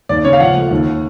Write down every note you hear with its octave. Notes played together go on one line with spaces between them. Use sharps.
D#2 D5
C#3 C#5
F5
F3 F#5
A3
D#2